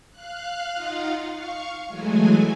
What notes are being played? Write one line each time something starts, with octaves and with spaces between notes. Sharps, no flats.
F5 F#6
D#4 F4 F5 F#5
F5 C#6
E3 F#3 G#3 A3 G#5